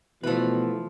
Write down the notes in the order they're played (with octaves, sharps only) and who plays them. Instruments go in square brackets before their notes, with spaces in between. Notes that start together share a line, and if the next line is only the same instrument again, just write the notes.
[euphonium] B2 [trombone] E3 [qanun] F3 B5 [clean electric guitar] A3 B4